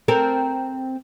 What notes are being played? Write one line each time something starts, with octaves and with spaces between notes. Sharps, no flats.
C4 A4 A#4